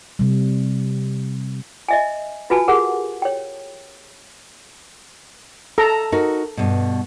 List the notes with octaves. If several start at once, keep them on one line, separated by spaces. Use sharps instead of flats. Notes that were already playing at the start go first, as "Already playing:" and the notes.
C3 G3
D#5 E5 G#5
F4 F#4 B4 G#5 A5
G4 G#4 A#4 F#5
C#5 G5
A4 A#5
D#4 F#4 A#4
G2 B2